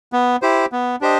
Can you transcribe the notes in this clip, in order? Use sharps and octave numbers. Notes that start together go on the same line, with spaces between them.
B3
E4 G4 C5
B3
D4 G4 C5 D#5